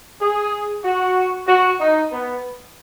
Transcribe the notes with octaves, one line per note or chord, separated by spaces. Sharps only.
G#4
F#4
F#4
D#4
B3